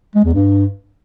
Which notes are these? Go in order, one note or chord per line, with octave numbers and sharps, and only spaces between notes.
G#3
E2
G2